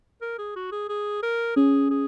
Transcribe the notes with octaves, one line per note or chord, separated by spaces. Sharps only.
A#4
G#4
F#4
G#4
G#4
A#4
C#4 G#4
G#4